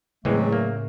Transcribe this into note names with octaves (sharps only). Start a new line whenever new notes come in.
E2 A2 C#3 E3 F#3 G#3 A3 C4
A#3